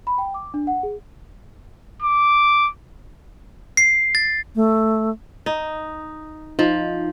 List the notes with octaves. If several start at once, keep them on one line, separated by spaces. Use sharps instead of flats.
B5
G5
D6
D4
F#5
G#4
D6
C7
A6
A3
D#4
F3 D#4